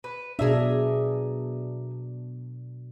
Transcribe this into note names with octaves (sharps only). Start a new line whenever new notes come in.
B4
B2 D4 G#4 A#4 E5